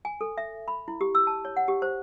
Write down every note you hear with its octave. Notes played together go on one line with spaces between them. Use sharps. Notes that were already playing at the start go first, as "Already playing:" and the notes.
G#5
A4
E5
B5
E4
G4
E6
A5
C#5
F#5
G4
C5